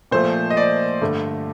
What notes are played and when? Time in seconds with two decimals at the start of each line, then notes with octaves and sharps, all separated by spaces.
0.11 A#2 F3 A3 C5
0.50 D#5
0.57 D5
1.01 G2 D3 A3